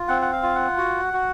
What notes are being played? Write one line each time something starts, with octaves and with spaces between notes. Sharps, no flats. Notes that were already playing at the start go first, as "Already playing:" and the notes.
Already playing: F4
C4 F#5
F#5
F5
F4
F#5
F#4
F#4